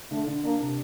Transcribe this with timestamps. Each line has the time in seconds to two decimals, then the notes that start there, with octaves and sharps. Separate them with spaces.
0.11 D3 A3
0.27 D3
0.44 A#3 D4
0.60 C3